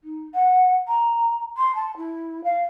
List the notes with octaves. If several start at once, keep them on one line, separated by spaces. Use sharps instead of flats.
D#4
F#5
A#5
C6
A5
E4
F5